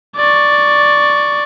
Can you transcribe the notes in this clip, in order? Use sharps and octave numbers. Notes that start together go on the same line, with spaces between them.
D5 C#6